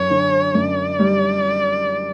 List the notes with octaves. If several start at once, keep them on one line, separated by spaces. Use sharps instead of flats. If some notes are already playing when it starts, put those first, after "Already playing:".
Already playing: F#2 C#5
D3
F#2 D5
G3